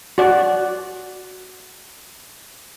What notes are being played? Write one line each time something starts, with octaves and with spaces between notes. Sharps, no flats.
F#4 D5